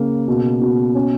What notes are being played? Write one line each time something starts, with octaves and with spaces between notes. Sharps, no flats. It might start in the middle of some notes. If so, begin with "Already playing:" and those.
Already playing: C#3 A#3
B2
B2
C#4